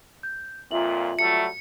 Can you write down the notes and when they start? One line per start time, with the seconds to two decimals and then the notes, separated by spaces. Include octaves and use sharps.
0.23 G6
0.71 F2 A#2 F4 E5 F#7
1.19 F#3 G3 A3 C#7